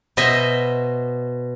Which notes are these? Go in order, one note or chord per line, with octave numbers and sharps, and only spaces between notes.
B2 C5 D#5 E5